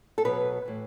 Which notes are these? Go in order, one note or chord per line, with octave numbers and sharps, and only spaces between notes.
A4
B2 F#3 B4
A2 E3